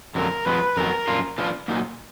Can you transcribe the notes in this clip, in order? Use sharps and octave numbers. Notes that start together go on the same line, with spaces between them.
F2 D3 F#3 A#4
F2 F3 G#3 B3 B4
F2 D#3 F#3 B3 A#4
F#2 F3 A#3 D4 F4
F3 B3 D4 F4
A#2 F#3 A#3 D#4